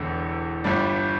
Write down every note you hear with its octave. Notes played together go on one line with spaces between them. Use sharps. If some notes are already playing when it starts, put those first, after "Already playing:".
Already playing: E1 E2 D3
G1 G2 G3 D4